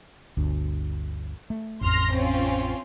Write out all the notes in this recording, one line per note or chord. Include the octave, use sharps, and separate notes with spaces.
G1 D2
A3
A1 F2 C6 F6 A#6
C4 C#4 F4